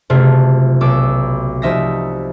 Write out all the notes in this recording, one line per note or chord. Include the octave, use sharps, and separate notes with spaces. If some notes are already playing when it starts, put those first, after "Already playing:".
F#1 C3 A3 F4
B1 D6 E6
C2 F3 D#4 E5 D#6 A#6